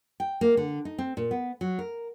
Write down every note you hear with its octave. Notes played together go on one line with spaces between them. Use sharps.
G5
A#3
D3
D#4
C4
A#2
B3
F#3
A#4